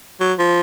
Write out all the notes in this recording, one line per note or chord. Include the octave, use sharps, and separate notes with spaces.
F#3
F3